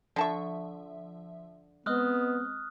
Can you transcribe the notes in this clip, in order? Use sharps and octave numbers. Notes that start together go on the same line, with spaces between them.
D3 F3 E5 A5 C#6
G#3 B3 C4 D#5 D#6 F6 F#6